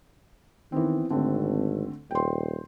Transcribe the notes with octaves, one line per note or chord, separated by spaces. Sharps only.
D#3 E3 B3 C4
G#1 D3 A3 C4
D#1 G5 C6